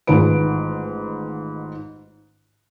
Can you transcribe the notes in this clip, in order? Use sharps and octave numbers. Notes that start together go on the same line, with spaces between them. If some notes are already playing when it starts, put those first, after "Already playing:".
A1 G#2 D#3 F4 B4 D7